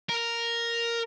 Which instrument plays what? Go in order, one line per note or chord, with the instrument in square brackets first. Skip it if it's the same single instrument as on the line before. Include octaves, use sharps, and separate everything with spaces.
[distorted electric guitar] A#4